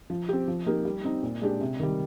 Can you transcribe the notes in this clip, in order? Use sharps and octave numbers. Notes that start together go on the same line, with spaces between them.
F3
C4 G4
F3
A#3 D#4 G4
G3
C4 D#4
A#2
G#3 D4 G4
C3
D#3 G3